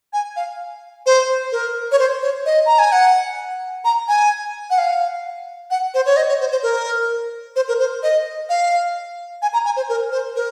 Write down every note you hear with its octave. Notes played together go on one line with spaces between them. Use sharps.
G#5
F5
C5
A#4
C#5
C5
C#5
D#5
A#5
G#5
F#5
A#5
G#5
F#5
F5
F#5
C5
C#5
D#5
C#5
C5
C5
A#4
C5
A#4
C5
D#5
F5
G#5
A#5
G#5
C5
A#4
C5
A#4